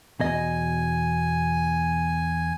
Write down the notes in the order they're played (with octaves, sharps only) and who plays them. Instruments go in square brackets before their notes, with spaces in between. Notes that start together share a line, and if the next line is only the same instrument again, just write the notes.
[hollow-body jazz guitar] E2 B2 D#5 [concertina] G#5